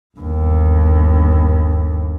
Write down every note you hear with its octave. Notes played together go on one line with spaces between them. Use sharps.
G1 D#2